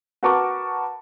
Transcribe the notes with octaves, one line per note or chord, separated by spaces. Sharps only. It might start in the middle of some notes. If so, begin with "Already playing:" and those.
F#4 A#4 B4 A5 C#6 D6